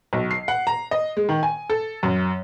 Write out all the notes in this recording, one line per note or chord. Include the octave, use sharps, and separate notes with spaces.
B1
C7
F#5
A#5
D#5
G#3
D#3
G#5
A4
F#2